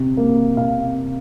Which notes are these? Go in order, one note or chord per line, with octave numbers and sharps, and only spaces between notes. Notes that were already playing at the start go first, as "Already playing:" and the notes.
Already playing: C3
A#3
C3 F5